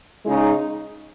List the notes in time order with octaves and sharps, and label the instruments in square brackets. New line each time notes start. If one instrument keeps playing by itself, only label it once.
[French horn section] C#3 G#3 D#4